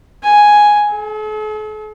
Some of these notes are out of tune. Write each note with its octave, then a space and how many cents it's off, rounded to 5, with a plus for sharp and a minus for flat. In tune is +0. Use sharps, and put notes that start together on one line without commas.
G#5 +0
A4 -45